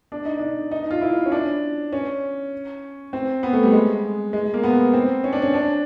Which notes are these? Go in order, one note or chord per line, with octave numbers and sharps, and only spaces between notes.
D4
D#4
D4
D#4
F4
E4
C#4
D4
C#4
C4
B3
A3
G3
G#3
G#3
A#3
B3
C4
C#4
D4
C#4
D4